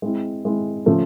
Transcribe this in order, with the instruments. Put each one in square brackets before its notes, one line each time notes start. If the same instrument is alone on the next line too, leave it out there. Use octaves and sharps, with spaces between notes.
[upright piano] G#3 C4 E4
G#3 C4 E4
C#3 F3 A3